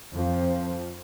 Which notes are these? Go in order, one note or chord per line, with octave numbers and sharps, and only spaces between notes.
F2 F3